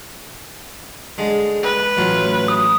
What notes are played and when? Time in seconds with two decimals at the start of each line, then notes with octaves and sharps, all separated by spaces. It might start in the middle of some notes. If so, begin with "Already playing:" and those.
1.18 D3 G#3
1.63 B4
1.97 A1 F#3 F4
2.48 D#6